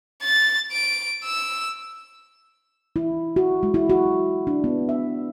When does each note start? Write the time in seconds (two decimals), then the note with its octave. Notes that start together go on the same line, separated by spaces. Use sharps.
0.23 A6
0.72 D7
1.24 E6
2.96 E4
3.36 F#4
3.63 G#3
3.74 E4
3.90 F#4
4.47 D4
4.64 B3
4.89 E5